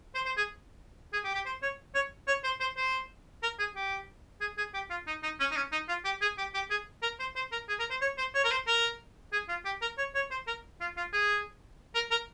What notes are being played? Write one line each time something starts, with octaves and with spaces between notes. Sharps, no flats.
C5
C5
G#4
G#4
G4
G4
C5
C#5
C#5
C#5
C5
C5
C5
A#4
G#4
G4
G#4
G#4
G4
F4
D#4
D#4
C#4
D#4
C#4
D#4
F4
G4
G#4
G4
G4
G#4
A#4
C5
C5
A#4
G#4
A#4
C5
C#5
C5
C#5
A#4
C5
A#4
G#4
F4
G4
A#4
C#5
C#5
C5
A#4
F4
F4
G#4
A#4
A#4